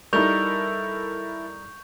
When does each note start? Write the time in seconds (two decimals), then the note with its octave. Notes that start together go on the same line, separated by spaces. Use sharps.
0.13 G3 D#4 E4 A4 A#4 C#6 G6 F7